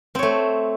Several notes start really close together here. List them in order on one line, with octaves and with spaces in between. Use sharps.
C4 C#5 A3